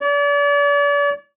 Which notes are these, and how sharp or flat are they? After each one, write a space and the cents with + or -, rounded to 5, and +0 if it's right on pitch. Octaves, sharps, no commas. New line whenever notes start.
D5 -40